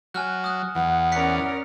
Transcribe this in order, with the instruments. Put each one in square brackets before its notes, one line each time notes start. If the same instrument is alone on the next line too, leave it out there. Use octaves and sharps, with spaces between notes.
[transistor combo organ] F#3 [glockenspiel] G#5 F6 F#6
[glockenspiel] D#6 F#6
[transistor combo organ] E2 [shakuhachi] F#5
[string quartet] C#4 A#4 D5 [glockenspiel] F#6 B6 C#7